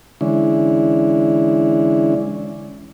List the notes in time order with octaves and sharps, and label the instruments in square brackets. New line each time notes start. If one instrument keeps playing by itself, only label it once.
[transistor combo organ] D3 E3 G#3 C#4 D4 E4